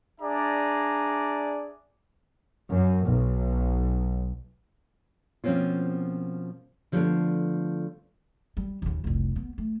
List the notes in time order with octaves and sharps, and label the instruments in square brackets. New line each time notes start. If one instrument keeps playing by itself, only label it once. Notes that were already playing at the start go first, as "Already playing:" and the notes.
[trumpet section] D4 G#4 D5 E5 A#5
[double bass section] F#2
B1
[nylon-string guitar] B2 F3 A#3 C4 C#4 F4
D3 F3 G3 A3 B3 D4
[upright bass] G3
D#2 C#3
F1 C2
B3
A3